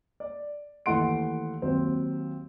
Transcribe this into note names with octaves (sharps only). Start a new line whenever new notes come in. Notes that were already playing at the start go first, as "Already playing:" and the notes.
D5
D#2 E3 A3 F#5 C6 D7
D#2 F#3 C4